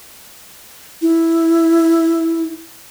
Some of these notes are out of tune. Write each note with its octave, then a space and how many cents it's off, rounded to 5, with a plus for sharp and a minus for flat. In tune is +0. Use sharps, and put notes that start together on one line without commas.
E4 +0